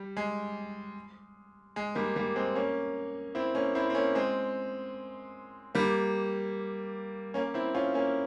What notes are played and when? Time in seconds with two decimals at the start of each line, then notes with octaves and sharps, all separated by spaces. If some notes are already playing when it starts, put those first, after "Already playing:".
Already playing: G3
0.17 G#3
1.76 G#3
1.95 G3 A#3
2.16 G3 A#3
2.36 G#3 C4
2.55 A#3 C#4
3.35 C4 E4
3.55 A#3 C#4
3.75 C4 E4
3.90 C4
3.95 A#3 C#4
4.15 G#3 C4
5.75 G3 A#3
7.34 A#3 C#4
7.54 C4 E4
7.74 C#4 F4
7.94 A#3 C#4